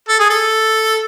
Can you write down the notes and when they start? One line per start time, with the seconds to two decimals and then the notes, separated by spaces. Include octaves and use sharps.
0.09 A4
0.19 G#4
0.30 A4